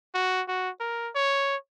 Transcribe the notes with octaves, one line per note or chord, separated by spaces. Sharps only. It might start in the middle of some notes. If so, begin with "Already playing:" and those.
F#4
F#4
A#4
C#5